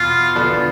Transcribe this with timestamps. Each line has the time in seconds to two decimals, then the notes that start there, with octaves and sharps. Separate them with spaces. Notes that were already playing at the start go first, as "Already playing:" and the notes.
Already playing: E2 B2 B3 F4
0.35 D3 F3 B3 D4